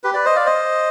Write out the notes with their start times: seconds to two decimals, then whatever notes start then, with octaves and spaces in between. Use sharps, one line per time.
0.04 G4 B4
0.14 B4 D5
0.25 C5 D#5
0.36 D5 F5
0.46 C5 D#5